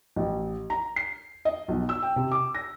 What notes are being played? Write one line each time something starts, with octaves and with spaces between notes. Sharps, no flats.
A1
A#5
C7
D#5
B1
E6
G5
C3
D6
A#6